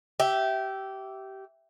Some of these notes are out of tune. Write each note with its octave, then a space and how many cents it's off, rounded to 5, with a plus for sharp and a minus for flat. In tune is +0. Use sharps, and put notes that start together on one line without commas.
G4 -20 E5 +0